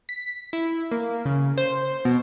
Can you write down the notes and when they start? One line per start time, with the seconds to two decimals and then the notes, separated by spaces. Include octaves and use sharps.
0.09 B6
0.53 E4
0.91 A#3
1.25 C#3
1.58 C5
2.05 B2